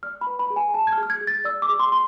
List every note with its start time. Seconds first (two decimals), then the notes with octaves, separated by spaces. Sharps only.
0.03 D5 F6
0.21 B5
0.27 B4
0.39 B5
0.50 G#4
0.56 G#5
0.74 G#4 A5
0.87 G#6
0.92 F6
0.98 G#4
1.03 F6
1.10 G#6
1.21 G#4
1.27 A6
1.45 D5 E6
1.62 D6
1.69 G#4
1.80 C6
1.92 C6